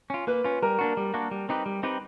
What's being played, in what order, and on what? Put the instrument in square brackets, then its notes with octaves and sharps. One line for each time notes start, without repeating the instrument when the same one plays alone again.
[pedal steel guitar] C#4 F4
[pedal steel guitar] A#3 [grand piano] B4
[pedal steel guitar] C#4 F4
[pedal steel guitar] G3 [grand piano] A#4
[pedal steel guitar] A#3 D4 F#4
G3
A#3 D4 F#4
G3
C4 D#4 G4 B4
G3
C4 D#4 G4 B4